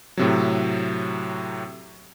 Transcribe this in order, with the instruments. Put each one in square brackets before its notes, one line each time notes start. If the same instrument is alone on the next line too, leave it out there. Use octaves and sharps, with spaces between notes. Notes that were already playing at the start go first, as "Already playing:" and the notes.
[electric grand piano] A2 C3 F#3